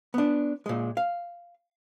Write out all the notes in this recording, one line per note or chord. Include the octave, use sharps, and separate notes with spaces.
B3 D4
A#2 G#3
F5